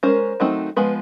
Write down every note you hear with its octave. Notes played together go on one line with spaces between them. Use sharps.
G#3 C#4 A#4 C5
D#3 F#3 A3 C4 D#4
F3 G#3 B3 B4